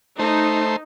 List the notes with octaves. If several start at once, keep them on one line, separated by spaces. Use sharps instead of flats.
A3 D#4 C5